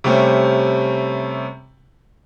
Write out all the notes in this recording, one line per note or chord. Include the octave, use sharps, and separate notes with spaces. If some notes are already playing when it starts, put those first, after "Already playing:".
C3 G3 A3 C4 C#4